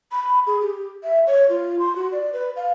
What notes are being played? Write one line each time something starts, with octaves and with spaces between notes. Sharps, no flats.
B5
G#4
G4
E5
C#5
F4
C6
F#4
D5
B4
F5